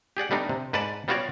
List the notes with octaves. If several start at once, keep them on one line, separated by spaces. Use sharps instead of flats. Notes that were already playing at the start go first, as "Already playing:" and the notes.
G4 G#4 D5 F#5
G3 A3 B3 D4 D#4
C3
G#2 B4 D5 F#5 A5
G3 B3 F4 F#4 C#5 D5